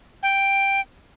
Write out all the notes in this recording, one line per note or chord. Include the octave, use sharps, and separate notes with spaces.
G5